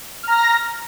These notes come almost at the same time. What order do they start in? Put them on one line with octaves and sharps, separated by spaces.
F6 A#5 A#6